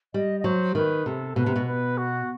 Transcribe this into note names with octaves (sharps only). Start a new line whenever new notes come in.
G3 D#5
D#5
F#3 C5
D#3 B4
C3 A4
B2 B4
C3
B2
B4
F#4